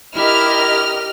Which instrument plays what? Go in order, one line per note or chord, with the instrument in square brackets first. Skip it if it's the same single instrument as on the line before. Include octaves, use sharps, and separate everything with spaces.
[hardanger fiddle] E4 [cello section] G4 A#4 [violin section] D#5 F6